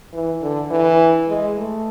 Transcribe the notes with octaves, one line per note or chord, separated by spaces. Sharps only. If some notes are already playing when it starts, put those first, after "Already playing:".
E3
D3
E3
G#3
A3